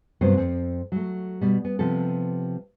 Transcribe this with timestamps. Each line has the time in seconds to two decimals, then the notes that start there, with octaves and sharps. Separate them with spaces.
0.21 G2 C3 F#3 B3 C4 C5
0.37 F2 C4
0.92 F#3 A3
1.41 B2 G3
1.65 B3
1.79 C3 F3 B3 A4